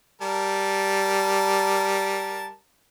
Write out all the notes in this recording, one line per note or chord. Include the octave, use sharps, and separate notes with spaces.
G3 A#4 A5